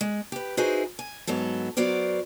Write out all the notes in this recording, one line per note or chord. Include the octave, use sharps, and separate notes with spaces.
G#3
G4 B4
D#4 E4 F#4 G#4 B4 C5
G#5
G#2 F#3 B3 A4
F#3 B3 F#4 A#4 C5 D5